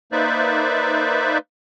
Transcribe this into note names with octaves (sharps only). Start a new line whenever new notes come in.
A#3 D#4 B4 C5 D5 E5